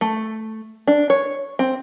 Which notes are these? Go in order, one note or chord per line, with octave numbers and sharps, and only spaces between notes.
A3
D4
C#5
C4